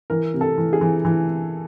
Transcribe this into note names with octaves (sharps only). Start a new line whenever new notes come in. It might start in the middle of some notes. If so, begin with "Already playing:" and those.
E3 A#4
C3
A4
E3
G#4
E3
E3